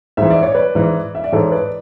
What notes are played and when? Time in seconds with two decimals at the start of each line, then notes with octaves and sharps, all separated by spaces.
0.17 G#2 E3 E5
0.30 D5
0.43 C#5
0.55 B4 D5
0.75 G#2 E3
1.15 E5
1.24 D5
1.32 G#2 E3 A4 C#5
1.52 B4 D5